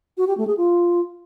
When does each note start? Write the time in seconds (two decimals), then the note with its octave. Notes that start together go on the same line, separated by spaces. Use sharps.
0.18 F#4
0.28 G4
0.37 A3
0.47 G#4
0.57 F4